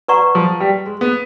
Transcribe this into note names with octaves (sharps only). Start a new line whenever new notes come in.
B4 D5 F#5 A#5 C#6
F3
G3
G#3
B3